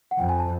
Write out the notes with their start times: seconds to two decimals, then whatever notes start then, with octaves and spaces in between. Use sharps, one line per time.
0.11 F#5
0.19 F2 G5
0.29 G#5
0.39 A5